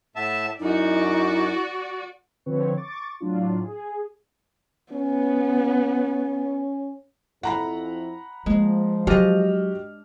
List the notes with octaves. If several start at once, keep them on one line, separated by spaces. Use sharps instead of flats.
A2 E5 F#5 A5
F#2 D#4 E4 F#4 D5
D3 F3 C4 B4 C#5
C#6 D6 A6
A2 F#3 D4 F4
G#4
B3 C#4
F2 E4 A4 F#5 A#5 B5
F3 G#3 A#3
F#3 G#3 D4 F#4 G4 D#5 F6